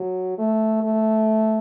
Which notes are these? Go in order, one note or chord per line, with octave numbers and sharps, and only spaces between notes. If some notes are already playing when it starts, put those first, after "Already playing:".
Already playing: F#3
A3
A3